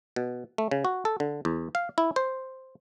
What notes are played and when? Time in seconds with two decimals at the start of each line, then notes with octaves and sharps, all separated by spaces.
0.16 B2
0.58 A3
0.71 C#3
0.85 F#4
1.05 A4
1.20 D3
1.45 E2
1.75 F5
1.98 E4
2.16 C5